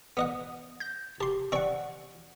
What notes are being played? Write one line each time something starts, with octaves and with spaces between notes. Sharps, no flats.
B3 D#5 F#5
G6 A#6
G4 A5 C6
C4 D5 F#5 C#6